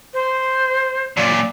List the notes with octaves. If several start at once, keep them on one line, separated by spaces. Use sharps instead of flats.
C5
F#2 A#2 D5